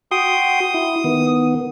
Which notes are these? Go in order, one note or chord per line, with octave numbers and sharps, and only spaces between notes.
F#4 G5 C6 D#6
E4
D#3 B3